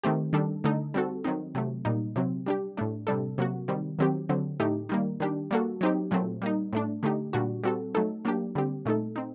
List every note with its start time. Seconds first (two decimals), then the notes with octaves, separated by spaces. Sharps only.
0.03 D#3 A3 C4 G4
0.33 D#3 G3 D4 A4
0.64 D3 A3 D#4 A4
0.94 G3 C4 F#4 A4
1.24 D#3 F#3 C4 D#4
1.55 C3 F#3 A3
1.85 A#2 G3 A#3 D#4
2.16 C3 F#3 C4
2.46 G3 D4 G4
2.77 A2 A3 D4
3.07 C3 G3 D4 A4
3.38 C3 F#3 A#3 F#4
3.68 D#3 G3 C4
3.99 D#3 F#3 C4 G4
4.29 D3 F#3 C4
4.60 A2 A3 D#4 G4
4.89 D#3 G3 A#3
5.20 D#3 G3 D4 G4
5.51 G3 A#3 F#4 A4
5.81 F#3 C4 D#4 G4
6.11 A#2 F#3 A3 C4
6.42 G3 A#3 D#4
6.73 A2 A3 D4
7.03 D3 A3 D#4 G4
7.33 A#2 G3 D4 F#4
7.64 G3 C4 F#4 A4
7.95 F#3 A3 D#4 A4
8.25 F#3 A#3 D4 G4
8.55 D3 G3 C4 G4
8.85 A#2 A3 D#4 A4
9.16 C4 D#4